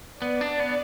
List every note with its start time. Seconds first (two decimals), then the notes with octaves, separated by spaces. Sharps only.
0.22 B3 D5
0.41 D4
0.60 B3